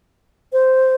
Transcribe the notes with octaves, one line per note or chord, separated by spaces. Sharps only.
C5